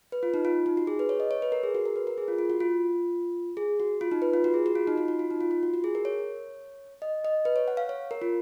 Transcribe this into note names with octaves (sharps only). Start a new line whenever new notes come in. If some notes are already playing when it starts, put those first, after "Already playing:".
B4
F4
D#4
F4
D#4
F#4
G#4
B4
C#5
D#5
C#5
B4
A#4
G#4
F#4
A#4
B4
A#4
G#4
F4
F4
F#4
F4
G#4
F#4
F4
D#4
B4
F4
F#4
G#4
F#4
F4
D#4
F4
F#4
F4
D#4
F4
F4
F#4
F#4
G#4
A#4
C#5
D#5
D#5
B4
C#5
F#5
F5
C#5
A#4
F4